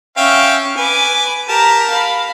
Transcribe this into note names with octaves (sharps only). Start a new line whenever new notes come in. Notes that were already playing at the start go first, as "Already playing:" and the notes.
C#4 E5 F5 G5 C#6
B4 G#5 D6
G4 A#4 A5 A#5
F5 B5